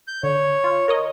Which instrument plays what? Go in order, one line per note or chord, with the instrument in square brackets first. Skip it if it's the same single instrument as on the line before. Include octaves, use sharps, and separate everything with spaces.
[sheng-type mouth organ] G6
[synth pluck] D3 [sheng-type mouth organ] C#5
[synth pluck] F4
A#4 C#5 D#5